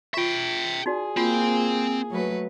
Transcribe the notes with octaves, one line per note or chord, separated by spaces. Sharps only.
F4 E5 G5 C#6
D#4 F#4 G#4 D5
A#3 C4 F4
F#3 A3 B4